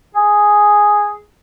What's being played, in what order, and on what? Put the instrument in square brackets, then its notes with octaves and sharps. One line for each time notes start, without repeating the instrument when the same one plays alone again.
[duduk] G#4